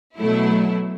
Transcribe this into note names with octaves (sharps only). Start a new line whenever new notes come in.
B2 F#3 A3 E4